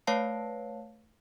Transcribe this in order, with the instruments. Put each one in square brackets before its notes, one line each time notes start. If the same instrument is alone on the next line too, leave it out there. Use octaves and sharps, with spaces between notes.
[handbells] A3 B4 C#5 F5 A5 C7